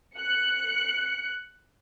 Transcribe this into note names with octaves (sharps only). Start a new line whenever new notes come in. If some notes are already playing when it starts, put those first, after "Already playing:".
F#6 C#7